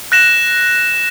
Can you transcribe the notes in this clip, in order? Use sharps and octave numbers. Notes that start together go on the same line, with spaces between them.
F#6 A#6 E7